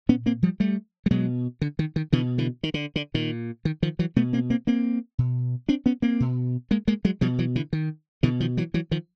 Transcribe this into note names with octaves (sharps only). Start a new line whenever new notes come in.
A#2 B3 C#4
A#3 C4
F3 G3
G3 A3
G3
B2 F#3 G#3
D3
D#3
D#3
B2 D3 E3
D3 E3
D#3
D3
D3
A#2 D#3
D#3
D#3 F3
E3 F#3
B2 A3 B3
A#3 C4
A#3 C4
A#3 C4
B2
C4 D4
B3 C#4
A#3 C4
B2
G#3 A#3
G#3 A#3
F#3 G#3
B2 F3 G3
E3 F#3
D3 E3
D#3
B2 D3 E3
D#3 F3
E3 F#3
E3 F#3
D#3 F3